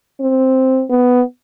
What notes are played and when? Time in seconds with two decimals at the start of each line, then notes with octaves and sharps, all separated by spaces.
0.20 C4
0.90 B3